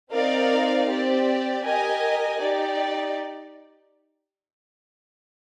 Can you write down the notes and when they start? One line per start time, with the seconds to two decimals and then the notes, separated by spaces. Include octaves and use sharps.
0.12 C4 D#4 A#4 D5 F5
0.88 C4 G4 D5
1.64 G4 A#4 D#5 G#5
2.40 D#4 G4 D5